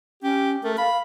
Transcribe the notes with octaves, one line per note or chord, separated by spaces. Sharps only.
C#4 G4
A3 A#4
F5 B5